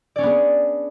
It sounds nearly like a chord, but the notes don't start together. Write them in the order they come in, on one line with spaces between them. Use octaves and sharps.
D5 C#4 D4 B3 G#4